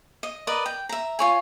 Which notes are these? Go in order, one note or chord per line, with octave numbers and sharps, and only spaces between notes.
D#5
A#4 B4 D5 D#5
G5
E5 A#5
F4 C#5 G#5